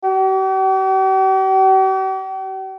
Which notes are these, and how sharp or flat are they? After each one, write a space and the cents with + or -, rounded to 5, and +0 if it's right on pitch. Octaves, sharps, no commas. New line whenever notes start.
G4 -45